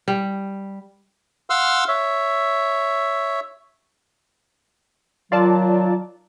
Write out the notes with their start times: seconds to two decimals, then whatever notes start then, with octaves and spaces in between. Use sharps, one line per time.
0.08 G3
1.50 F5 F#5 C6 E6 F6
1.88 C#5 E5
5.32 D#3 F#3 F4 D5 A5